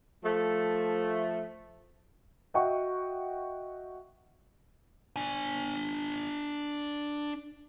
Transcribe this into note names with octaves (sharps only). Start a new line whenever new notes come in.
F3 A3
F#4 D#5 E5 F#5 G5 C#6
D4 G#5